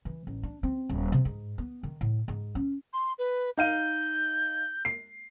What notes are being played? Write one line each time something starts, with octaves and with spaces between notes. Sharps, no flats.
E3
A1
D4
C4
D#1
C3
G#2
B3
D#3
A2
G#2
C#4
C6
B4
D#4 F5 G6 D#7
C7